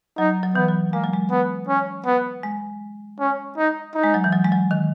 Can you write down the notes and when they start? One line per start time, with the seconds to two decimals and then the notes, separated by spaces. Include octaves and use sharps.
0.18 F#3 D#4
0.43 F#3
0.55 E3 B3
0.68 F#3
0.93 G#3 A#3
1.04 F#3
1.13 G#3
1.31 B3
1.68 C#4
2.06 B3
2.43 G#3
3.20 C#4
3.57 D#4
3.95 D#4
4.04 G#3
4.14 F#3
4.24 E3
4.32 F#3
4.45 G#3
4.52 F#3
4.71 D#3